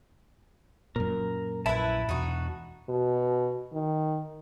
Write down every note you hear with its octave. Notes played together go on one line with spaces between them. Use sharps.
F#2 A#2 A#4
A#1 E4 B4 A5 B5
E2 B2 D#4 F#4
B2
D#3